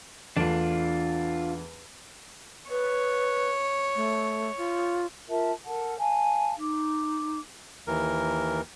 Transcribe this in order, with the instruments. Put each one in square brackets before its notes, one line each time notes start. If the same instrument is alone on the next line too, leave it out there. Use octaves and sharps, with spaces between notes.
[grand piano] E2 A3 D7 [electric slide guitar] D4 F4
[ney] B4 [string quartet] C#5
[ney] A3
F4
[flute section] F4 A#4 E5 A5
A4 A#4 F#5 A5
F5 G#5 A5
D#4 D6
[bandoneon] D#2 E3 A#4